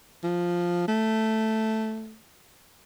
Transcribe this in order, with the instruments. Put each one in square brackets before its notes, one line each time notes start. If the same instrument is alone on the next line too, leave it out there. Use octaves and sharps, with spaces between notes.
[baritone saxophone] F3
A3